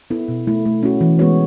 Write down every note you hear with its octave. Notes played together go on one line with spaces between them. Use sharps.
B3 E4 A4
B2
A3 E4
A3
C#4 F#4
E3
G#3 B3 F#4 C#5